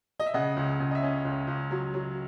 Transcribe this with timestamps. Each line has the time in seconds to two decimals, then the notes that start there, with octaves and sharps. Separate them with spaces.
0.20 D#5
0.26 E5
0.34 C#3 D#5 F#5
0.57 C#2
0.80 C#3
0.91 D#5
0.95 E5
1.03 C#4
1.25 C#2
1.47 C#2
1.71 F#3
1.94 F#3